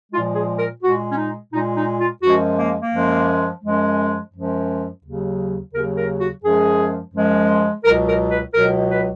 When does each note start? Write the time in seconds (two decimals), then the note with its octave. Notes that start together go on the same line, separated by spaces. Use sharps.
0.12 A#2 F3 G#3 F4
0.36 G#4
0.59 A#4
0.82 A#2 G#3 F#4
1.11 C#4
1.18 D#4
1.53 A#2 G#3 D#4
1.76 D#4
1.99 F4
2.23 F#2 F3 G#3 F#4
2.58 A#3
2.81 A#3
2.93 F#2 F3 G#3
3.64 F#2 F3 G#3
4.34 F#2 F3 G#3
5.04 D#2 C#3 F#3
5.74 D#2 C#3 F#3 A#4
5.97 A#4
6.21 F#4
6.44 F#2 F3 G#3 G#4
7.14 F#2 F3 G#3
7.85 C#2 B2 F#3 A#4
8.08 A#4
8.31 B4
8.55 C#2 B2 F#3 A#4
8.90 B4